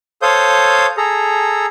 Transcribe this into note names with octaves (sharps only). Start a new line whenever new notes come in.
A4 C5 C#5 F5 D#6 G6
G#4 A4 A#5